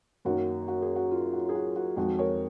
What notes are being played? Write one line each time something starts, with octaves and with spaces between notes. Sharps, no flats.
F#2 D#3 F#3 A#3 F#4
F#4
G#4
F#4
F4
F#4
G#4
F#4
F#4
F2 D#3 G#3 F#4
A#4 C#5